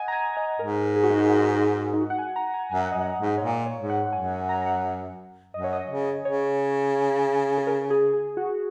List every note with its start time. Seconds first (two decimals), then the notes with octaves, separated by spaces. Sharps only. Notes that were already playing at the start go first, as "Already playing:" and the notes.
Already playing: D#5 F#5 G#5
0.08 A#5
0.12 G#5
0.37 D#5
0.59 G#2 A#4
0.96 G#4
1.03 F#4
1.10 D#4
1.18 F#4
1.93 D#4
2.01 F#4
2.10 F#5
2.19 G#5
2.36 A#5
2.54 G#5
2.71 F#2 G#5
2.81 F#5
2.92 F#2 D#5
3.01 F#5
3.19 G#2
3.38 C#5
3.42 A#2 D#5
3.66 C#5
3.78 G#2
3.90 F#5
4.13 F#2 G#5
4.49 A#5
4.66 F#5
5.54 F#2 D#5
5.64 C#5
5.73 D#5
5.90 C#3
6.25 C#3 C#5
7.58 G#4
7.67 A#4
7.90 G#4
8.14 G#4
8.37 F#4